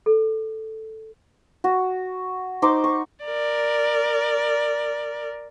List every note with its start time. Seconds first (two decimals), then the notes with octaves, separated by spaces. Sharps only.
0.06 A4
1.64 F#4
2.62 D#4 C5 C6 D6
2.84 C#6
3.24 A#4 D5